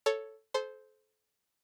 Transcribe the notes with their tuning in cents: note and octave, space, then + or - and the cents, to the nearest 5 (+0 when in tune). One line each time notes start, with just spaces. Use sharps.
A4 +0 C#5 +0
A4 -35 C5 -5